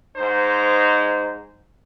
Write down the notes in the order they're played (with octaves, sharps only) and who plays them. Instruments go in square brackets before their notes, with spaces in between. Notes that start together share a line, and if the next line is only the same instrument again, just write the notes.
[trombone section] G#2 D#4 C5